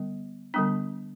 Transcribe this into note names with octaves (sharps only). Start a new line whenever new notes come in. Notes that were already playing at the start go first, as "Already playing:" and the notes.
Already playing: D3 G3 B3
D3 G3 B3 D4